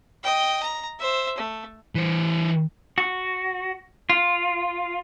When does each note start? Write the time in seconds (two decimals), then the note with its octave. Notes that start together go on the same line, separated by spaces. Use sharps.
0.23 D#5 G5
0.63 A#5
0.99 C5 E5
1.38 A3
1.95 E3 C5
2.98 F#4
4.10 F4